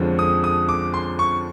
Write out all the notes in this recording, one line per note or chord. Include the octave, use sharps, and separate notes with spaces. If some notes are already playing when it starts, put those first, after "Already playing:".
Already playing: F2 D3 F3 G#3 C#4
D#6
D#6
D6
C6
C#6